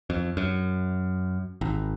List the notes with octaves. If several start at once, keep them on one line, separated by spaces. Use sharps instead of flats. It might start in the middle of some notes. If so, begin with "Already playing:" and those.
F2
F#2
G#1